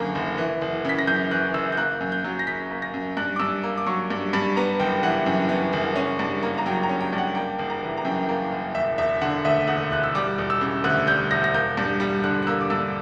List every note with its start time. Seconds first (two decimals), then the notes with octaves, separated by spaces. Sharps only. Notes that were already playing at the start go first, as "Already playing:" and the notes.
Already playing: F#1 F#2 D3 A#3
0.15 F#1
0.38 E3
0.61 F#1
0.85 C#3 B6
0.99 A#6
1.07 F#2 G6
1.31 E3 F#6
1.54 F#1 E6
1.72 G6
1.77 A#3 F#6
2.01 F#2
2.12 G6
2.24 F#3
2.39 A#6
2.47 C#3 B6
2.70 A#3
2.82 A#6
2.94 F#2
3.17 G2 F#6
3.36 D6
3.39 G2 E6
3.63 A#3
3.77 D6
3.87 F#3 C#6
4.10 G2
4.33 G2 B5
4.56 B3 A#5
4.79 F#1 G5
5.03 E3 F#5
5.26 F#2
5.49 B3
5.73 F#1
5.96 C#4
6.19 G2
6.43 A#3
6.58 A#5
6.66 F#3 G5
6.83 A#5
6.89 C#4
7.00 G5
7.13 G2
7.18 F#5
7.35 A#3 G5
7.59 F#1
7.70 A#5
7.83 E3
7.97 A#5
8.05 F#2 G5
8.29 A#3
8.52 F#1
8.75 E1 E5
8.98 E1 E5
9.21 D3 F#5
9.45 D2 E5
9.68 E1 F#5
9.91 E1 F#6
10.04 E6
10.15 G3 D6
10.38 E1
10.50 E6
10.61 C#3
10.84 D2 F#6
11.07 G3 G6
11.31 E1 A#6
11.44 A#6
11.54 A#3 G6
11.77 G2
12.00 G3
12.24 D3 F#6
12.43 F#6
12.47 A#3 E6
12.61 D6
12.70 G2 E6